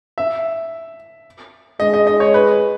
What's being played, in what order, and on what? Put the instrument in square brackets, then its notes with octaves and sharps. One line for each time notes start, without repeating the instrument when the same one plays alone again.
[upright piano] E5
[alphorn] G#3 [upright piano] D#5
[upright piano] D#5
D#5
C#5
B4